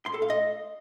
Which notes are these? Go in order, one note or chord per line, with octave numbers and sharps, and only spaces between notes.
C6
A4
F5
D#5